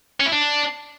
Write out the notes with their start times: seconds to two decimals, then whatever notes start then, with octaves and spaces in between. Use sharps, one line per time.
0.20 C#4
0.26 E4
0.32 D4